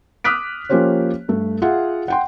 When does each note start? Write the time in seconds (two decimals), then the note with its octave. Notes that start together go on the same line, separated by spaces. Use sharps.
0.24 D6 D#6 F6 F#6 B6 D7
0.70 F3 A#3 C#4 G4 C5 C#5
1.28 G2 A3
1.62 F4 G#4 E5 F#5
2.08 F#5 G5 C6